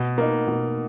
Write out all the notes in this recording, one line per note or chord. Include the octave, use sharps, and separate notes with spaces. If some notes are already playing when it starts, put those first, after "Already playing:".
Already playing: B2
A#3 D#4
B2